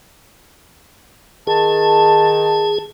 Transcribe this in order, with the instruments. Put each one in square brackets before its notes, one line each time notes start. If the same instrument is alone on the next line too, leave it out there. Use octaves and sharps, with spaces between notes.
[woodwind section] D#3 A5 [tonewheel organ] G#4